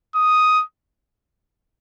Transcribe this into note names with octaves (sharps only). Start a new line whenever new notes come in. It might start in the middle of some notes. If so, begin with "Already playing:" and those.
D#6